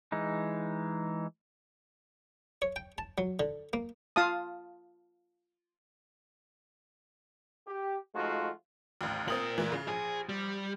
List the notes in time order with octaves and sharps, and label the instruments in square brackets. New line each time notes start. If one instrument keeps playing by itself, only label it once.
[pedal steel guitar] E3 G#3 D#4
[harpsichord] C#5
G5
A5
F#3
D3
A#3
[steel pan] F4 F5 A5 D#6
[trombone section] G4
F3 G#3 A3 D#4 F4 F#4
[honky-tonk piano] A1 D#2
[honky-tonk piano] C4 D#6 F#7 [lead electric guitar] F4 A#4
[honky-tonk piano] G#2 E3
C#3
[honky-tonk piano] A#1 [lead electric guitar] G#4
[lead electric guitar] G3